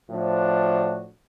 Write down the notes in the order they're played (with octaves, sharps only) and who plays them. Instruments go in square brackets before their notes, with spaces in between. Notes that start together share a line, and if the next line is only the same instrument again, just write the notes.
[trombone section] A2 F3 D4 F#4